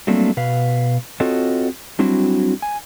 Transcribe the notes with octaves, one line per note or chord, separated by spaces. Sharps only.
F#3 G3 A3 A#3 C4 D4
B2 B4 F5
C4 F4 F#4 A4 C#5 D#5
F#3 G3 C4 D4 E4 F#4
G#5